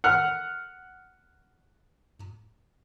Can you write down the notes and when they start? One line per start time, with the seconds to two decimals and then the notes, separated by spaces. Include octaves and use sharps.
0.04 F#5 F6